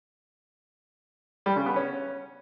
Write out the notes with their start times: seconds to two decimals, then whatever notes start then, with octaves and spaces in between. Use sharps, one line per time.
1.46 G3
1.56 C#3
1.66 B3
1.76 C#4